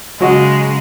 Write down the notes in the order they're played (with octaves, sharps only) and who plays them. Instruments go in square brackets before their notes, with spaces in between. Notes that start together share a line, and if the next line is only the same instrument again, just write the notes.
[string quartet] C#3 G#3 [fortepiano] F#3 F#4 D#5